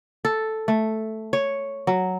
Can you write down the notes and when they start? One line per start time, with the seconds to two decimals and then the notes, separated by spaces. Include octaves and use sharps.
0.25 A4
0.68 A3
1.33 C#5
1.87 F#3